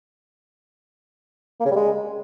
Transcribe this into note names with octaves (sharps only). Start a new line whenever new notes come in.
A#3
C#3
G3
G#3